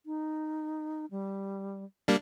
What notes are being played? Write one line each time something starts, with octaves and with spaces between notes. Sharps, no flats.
D#4
G3
G3 A#3 D4